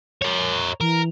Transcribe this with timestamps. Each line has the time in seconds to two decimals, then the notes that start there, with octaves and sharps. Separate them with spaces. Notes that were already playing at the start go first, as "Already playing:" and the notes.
0.22 A#4 C#5
0.81 E3 A#4